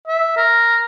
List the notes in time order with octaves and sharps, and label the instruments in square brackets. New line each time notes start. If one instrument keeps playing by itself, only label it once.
[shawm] E5
A#4